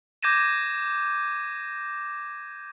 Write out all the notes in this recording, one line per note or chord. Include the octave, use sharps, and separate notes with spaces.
D6 G6 G#6 A#6 D#7 E7